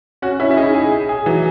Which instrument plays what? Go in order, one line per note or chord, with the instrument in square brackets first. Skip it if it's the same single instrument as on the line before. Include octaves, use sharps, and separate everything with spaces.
[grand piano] C#4 [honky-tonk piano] F#4
[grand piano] C#4 [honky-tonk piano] E4
[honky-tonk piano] E4
[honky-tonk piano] D#4 [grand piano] G#4
[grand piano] G#4
G#4
G#4
[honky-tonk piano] E3 [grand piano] F#3